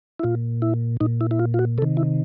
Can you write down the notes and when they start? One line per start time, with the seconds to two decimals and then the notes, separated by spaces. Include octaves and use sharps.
0.19 E4
0.23 A#2 F4
0.62 E4
1.00 A#2 D#4
1.21 E4
1.31 E4
1.39 F4
1.54 F4
1.59 F#4
1.78 C3 A4
1.82 D#3
1.97 E4